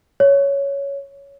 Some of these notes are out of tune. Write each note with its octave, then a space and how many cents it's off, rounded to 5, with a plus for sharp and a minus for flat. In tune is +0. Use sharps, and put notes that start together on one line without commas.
C#5 +10